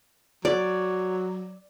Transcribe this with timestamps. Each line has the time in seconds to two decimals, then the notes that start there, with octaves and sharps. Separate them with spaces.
0.45 F#3 D5